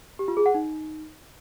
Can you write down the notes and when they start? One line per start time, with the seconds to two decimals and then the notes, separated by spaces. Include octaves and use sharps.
0.19 G4
0.28 F4
0.37 G#4
0.46 F#5
0.54 D#4